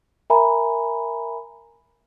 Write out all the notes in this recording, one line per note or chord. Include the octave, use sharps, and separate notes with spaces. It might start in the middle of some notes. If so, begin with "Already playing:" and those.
A#4 E5 G#5 A#5 B5